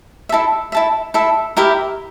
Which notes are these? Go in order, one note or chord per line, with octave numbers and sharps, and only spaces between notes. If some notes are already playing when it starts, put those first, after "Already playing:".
E4 A4 E5
E4 A4 E5
E4 A4 E5
E4 G4 A#4 E5